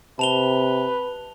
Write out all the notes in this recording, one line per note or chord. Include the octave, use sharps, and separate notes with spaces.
C3 B4 A5 F7 G7